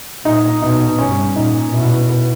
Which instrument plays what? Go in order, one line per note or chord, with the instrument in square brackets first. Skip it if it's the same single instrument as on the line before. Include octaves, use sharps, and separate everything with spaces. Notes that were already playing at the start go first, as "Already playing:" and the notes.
[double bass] A#2 [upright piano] D#4
[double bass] B2 [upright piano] D#4
[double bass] G2 [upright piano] C#4
[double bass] A#2 [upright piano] D#4
[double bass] B2 [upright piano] E4
[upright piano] B4